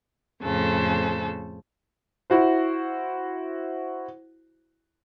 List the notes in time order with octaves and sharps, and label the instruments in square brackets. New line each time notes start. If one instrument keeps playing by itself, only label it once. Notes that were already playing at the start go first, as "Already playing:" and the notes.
[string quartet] F2 A2 C#3 A4 C5
[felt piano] E4 F#4 C5